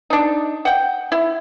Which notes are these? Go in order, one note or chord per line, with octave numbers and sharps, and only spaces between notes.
D4 D#4
F#5 G5
E4